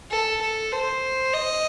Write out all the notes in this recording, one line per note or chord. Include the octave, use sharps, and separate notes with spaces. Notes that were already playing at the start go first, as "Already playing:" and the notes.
A4
A4
C5
D#5